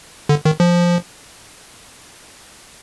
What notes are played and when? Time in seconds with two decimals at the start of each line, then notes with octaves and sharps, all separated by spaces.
0.29 D3
0.45 D#3
0.60 F3